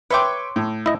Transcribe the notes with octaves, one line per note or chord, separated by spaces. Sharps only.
B4 C#5 E5 G5 C6 D6
A2
E4 D#5